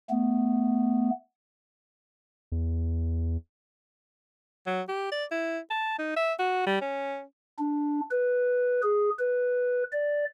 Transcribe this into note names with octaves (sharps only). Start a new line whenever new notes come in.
A3 B3
E2
F#3
G4
D5
E4
A5
D#4
E5
F#4
G3
C#4
D4
B4
G#4
B4
D5